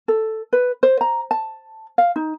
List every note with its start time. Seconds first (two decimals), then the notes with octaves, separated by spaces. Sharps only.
0.08 A4
0.53 B4
0.83 C5
1.01 A#5
1.31 A5
1.98 F5
2.16 D#4